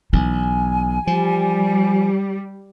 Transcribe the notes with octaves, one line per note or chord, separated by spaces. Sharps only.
B1 E3 G#5
F3 G3